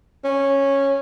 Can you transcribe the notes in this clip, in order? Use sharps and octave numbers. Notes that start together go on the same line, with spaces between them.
C#4